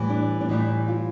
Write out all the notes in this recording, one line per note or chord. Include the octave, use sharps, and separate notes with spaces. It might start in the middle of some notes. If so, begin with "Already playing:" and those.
Already playing: A2 E3 G3
D4
D4
A2 E3 G3 D#4
F4